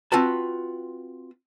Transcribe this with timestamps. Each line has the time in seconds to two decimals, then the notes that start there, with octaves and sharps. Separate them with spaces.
0.12 C4 F4 F#4 B4 A5